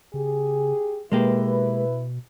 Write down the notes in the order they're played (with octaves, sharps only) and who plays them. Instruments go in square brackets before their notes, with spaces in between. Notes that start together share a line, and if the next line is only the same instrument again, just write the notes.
[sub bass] C#3 [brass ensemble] G4 G#4
[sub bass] B2 [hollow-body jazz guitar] G#3 A#3 G4 [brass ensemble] E4 B4